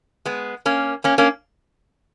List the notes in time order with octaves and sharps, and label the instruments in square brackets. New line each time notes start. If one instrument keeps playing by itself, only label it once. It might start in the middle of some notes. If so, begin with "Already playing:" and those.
[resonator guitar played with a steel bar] G#3 B3
A#3 C#4
A#3 C#4
A#3 C#4